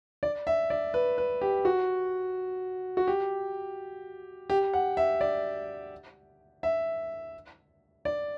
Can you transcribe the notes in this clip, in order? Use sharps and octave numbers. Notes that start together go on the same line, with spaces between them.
D5
E5
D5
B4
B4
G4
F#4
F#4
G4
G4
F#5
E5
D5
E5
D5